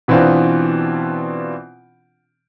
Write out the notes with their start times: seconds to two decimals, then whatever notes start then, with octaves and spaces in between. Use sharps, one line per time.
0.08 B2 E3 B3 C4 D4 F4